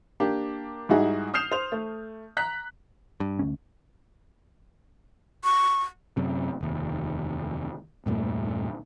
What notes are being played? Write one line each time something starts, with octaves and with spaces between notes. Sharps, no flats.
A#3 D4 G4
G#2 G3 D#4 E4 F#4 G#4
D#6 F6 G6 C7 E7 F7
C5 F7
A3
A#5 F#6 B6
G2
D2 C#4
C#6
F#2 C3
F1 D#2
E2 G2 A#2 A3